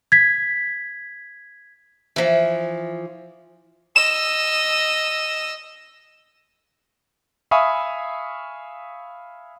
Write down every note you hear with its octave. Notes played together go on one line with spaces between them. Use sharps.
G#6 B6
E3 F3
D#5 E6 E7
E5 F5 G#5 B5 C#6 D#6